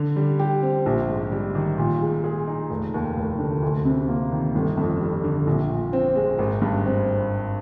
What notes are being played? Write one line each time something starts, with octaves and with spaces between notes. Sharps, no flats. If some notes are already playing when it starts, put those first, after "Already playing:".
Already playing: D3
G3
G4
C4
A#1
G#2
G3
D#3
A#2
G#3
G#4
D#4
F1
D#2
F1
D3
D2
C3
A#3
D#3
G1
F2
G3
D3
A#1
A#2
C4
G#3
G#1
G2
C4